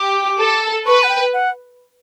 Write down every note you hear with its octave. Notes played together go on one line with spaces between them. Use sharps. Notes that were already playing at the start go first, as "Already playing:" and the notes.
Already playing: G4 D6
A4
B4 C#6
F#5
G5
F#5